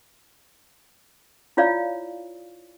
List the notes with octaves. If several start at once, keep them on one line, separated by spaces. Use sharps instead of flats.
E4 F4 C#5 D5 F5